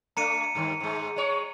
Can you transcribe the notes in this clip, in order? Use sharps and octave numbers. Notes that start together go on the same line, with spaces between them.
A3 D4 A#5 C#7 D#7
G2 D#3
G#2 G#3
G#3 C#5